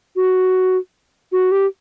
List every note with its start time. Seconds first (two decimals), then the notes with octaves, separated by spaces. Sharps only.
0.16 F#4
1.32 F#4
1.52 G4